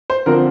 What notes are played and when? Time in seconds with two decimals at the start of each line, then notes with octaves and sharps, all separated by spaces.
0.10 C5
0.26 D3 F3 C4 A#4